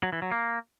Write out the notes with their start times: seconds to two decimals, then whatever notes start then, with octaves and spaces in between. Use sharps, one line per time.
0.03 F#3
0.13 E3
0.22 F#3
0.32 A#3